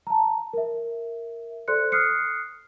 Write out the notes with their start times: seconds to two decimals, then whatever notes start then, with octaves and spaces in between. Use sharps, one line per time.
0.07 A5 A#5
0.53 A#4 E5
1.68 A4 C5 D5 C6 F#6 C#7
1.92 D#6 F6 F#6 C7 C#7